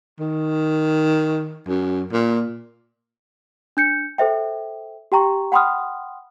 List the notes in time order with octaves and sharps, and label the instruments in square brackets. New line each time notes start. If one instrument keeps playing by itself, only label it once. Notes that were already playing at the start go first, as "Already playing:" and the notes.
[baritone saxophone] D#3
F#2
A#2
[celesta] D4 G6 C#7
A4 C5 E5 G5
G4 G5 A#5 C#6
F#5 G5 B5 C6 D#6 F6